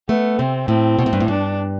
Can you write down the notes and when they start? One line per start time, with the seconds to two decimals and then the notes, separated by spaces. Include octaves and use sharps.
0.09 A3 B3
0.38 C3 C4
0.68 A2 C4
0.99 B2
1.06 A2
1.13 G2
1.20 A2
1.28 G2 D4